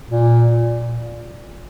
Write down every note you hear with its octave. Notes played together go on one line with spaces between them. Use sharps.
A#2